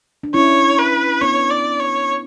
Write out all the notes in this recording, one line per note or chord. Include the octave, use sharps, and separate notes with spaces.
D4
C#4 E4 C#5
B4
B3 D4 C#5
D5
C#5